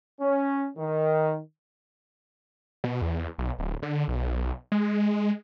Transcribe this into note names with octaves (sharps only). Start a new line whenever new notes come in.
C#4
D#3
B2
E2
B1
D1
D3
B1
G#3